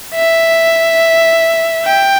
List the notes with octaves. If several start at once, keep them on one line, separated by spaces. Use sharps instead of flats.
E5
G5